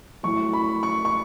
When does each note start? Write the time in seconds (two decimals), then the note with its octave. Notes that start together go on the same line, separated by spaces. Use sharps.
0.23 A2 F#3 A3 C#6
0.53 B5
0.83 C#6
1.05 C#6